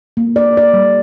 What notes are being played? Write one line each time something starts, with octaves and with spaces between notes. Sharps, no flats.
A#3
D5
D5
G3